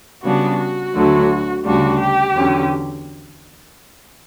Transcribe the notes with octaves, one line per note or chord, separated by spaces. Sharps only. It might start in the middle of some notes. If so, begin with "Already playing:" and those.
C#3 G3 B3 D4 F#4
F#4
D2 D3 F#3 A3
D2 C#3 G3 D4 F#4
G4
E2 D3 F#3 C#4